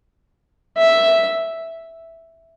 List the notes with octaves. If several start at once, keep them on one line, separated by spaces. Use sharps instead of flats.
E5